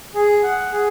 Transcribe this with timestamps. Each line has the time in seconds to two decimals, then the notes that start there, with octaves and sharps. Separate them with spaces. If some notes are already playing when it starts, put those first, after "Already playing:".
0.14 G#4
0.43 F#5
0.72 G#4